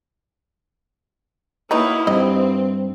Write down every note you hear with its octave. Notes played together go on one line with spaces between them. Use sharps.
F#3 A#3 D#4 E4 B4
G2 C4 D#5